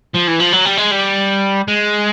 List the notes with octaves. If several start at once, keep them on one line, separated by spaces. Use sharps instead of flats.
F3
E3
F3
F#3
G3
G#3
G3
G#3